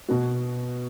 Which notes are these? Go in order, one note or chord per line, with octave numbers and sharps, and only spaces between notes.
B2 B3 F#4